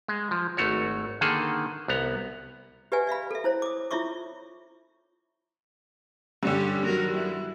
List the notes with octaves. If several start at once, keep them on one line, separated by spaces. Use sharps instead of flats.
G#3
F3
G#1 A3 F#4 C#5
D3 D#3 A#3 G#4 A4
C2 B3 A#5
G4 B4 D5 E5 F#5 G#5
D5 E5 F5 B5
A4 E5
E4 C5 C#5
D6 D#6
E4 F4 C#5 E5 C#6 D6
G2 D3 C#4 G4
D#3 F#3 A#4
E4